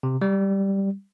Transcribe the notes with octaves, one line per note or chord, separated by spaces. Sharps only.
C3
G3